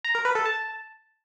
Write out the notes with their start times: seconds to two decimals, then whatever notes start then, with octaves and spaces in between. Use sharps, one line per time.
0.04 A#5
0.15 A#4
0.25 B4
0.35 A4
0.46 A5